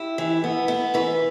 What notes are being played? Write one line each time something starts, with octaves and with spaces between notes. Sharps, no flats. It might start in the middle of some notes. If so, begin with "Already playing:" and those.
Already playing: E4 G4
E3
B3
B3
E3 B4